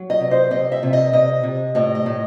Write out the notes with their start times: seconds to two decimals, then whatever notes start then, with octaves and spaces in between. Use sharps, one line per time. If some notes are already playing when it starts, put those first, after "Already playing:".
Already playing: F#3
0.10 D#5
0.20 C3
0.31 C5
0.51 C3 D#5
0.72 E5
0.83 C3
0.93 D#5
1.13 C3 D#5
1.43 C3
1.75 A2 D#5
1.95 D#5
2.06 A2